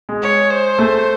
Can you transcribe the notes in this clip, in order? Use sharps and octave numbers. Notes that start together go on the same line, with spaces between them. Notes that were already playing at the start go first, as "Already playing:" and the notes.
G#3
C#5
C5
A3